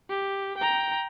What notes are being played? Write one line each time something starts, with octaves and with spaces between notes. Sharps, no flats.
G4
G5 A#5